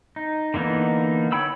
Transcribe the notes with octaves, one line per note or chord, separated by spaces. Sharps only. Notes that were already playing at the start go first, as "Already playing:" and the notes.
D#4
D3 E3 A#3 B3 D#4
C#5 F#5 G5 B5 E6